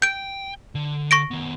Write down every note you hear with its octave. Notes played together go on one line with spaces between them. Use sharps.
G5 G6 D7
D3
C#6 A#6 D7
D#3 B3